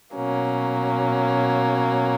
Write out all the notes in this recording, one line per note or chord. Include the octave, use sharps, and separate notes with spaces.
B2 F#3 A#3 C#4